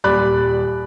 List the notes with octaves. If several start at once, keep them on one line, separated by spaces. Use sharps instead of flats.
D#1 G3 D5 B5 F#6